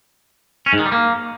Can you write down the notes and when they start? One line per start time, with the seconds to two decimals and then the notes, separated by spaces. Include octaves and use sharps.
0.66 C#4
0.73 G#2
0.79 D#3
0.86 G3
0.92 A#3